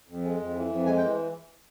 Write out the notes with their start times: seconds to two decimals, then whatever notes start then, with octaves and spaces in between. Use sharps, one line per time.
0.09 F2
0.24 G#3
0.40 F2
0.55 E3
0.70 F2
0.86 G#3 G#5
0.98 G5
1.02 E3